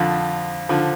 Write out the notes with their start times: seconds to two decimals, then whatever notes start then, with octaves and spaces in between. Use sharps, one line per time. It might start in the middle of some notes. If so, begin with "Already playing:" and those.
Already playing: F2 D3 F3
0.69 D3 F3